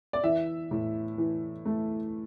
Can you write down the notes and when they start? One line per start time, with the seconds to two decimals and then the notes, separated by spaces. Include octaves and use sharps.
0.13 D5
0.24 E3 E5
0.71 A2
1.18 E3
1.65 A3